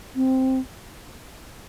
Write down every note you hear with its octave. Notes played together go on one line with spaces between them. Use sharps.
C4